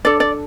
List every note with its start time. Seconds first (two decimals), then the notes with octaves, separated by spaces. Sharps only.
0.05 D4 A4 D5
0.20 D5